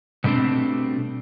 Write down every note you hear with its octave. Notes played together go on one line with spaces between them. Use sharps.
B2 G3 A3 C4 D4